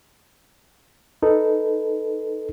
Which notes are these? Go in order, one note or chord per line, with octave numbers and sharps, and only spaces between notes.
D#4 A4 B4